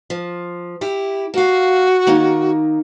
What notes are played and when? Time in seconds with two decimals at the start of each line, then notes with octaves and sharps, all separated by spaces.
0.10 F3
0.81 E4 G4
1.34 A#3 F#4 F5
2.07 D#3 A#3 D#4